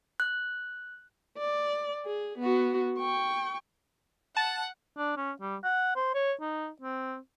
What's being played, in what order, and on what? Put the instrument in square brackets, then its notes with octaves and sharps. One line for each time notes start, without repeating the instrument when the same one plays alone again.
[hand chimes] F#6
[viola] D5
G#4
B3 F#4
G5 C#6
[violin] F#5 [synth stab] A5
[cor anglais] D4
C#4
G3
F#5
C5
C#5
D#4
C4